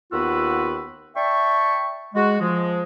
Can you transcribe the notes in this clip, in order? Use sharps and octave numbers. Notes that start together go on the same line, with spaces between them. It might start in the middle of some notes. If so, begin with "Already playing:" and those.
D#2 B3 F4 F#4 B4 E6
D5 E5 G5 A5 C#6
G#3 F#4
F3 G#3